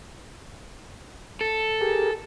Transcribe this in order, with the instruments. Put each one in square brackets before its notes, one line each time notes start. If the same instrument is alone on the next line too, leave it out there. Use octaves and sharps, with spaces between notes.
[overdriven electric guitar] A4
[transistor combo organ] G4 G#4 A#4